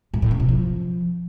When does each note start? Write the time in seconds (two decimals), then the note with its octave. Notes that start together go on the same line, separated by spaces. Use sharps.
0.14 G#2
0.22 A2
0.31 C#3
0.40 C3
0.48 F3